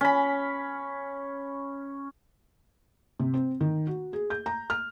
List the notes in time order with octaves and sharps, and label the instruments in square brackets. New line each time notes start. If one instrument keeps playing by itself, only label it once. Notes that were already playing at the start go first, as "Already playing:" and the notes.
[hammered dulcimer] C#4 B5
[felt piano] C3
C4
D#3
F#4
G#4
G6
A#5
F6